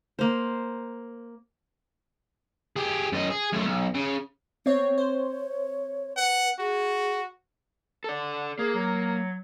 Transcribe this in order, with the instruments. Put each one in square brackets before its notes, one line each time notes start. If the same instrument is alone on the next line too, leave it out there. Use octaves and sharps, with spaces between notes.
[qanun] A#3 C5
[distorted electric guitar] G4 G#4
F#2 D#5
G#4
F#2 A3
B1
C#3
[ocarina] B3 [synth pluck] C4 C#5
[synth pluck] C5 [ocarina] C#5
[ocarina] B4 [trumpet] F#5
[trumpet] F#4 [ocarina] G#4
[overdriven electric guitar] A4 D5
[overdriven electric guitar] A#3 [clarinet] G#4
[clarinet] F#3